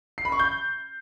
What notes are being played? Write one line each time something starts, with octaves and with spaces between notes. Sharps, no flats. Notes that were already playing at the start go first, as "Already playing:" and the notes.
C7
B5
C#6
G6